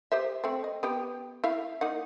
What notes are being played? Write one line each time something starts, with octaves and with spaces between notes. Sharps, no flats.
G4 C5 E5
A3 C4
D#5
B3 G4 G5
E4 E5 F5
A#3 D#4 F#5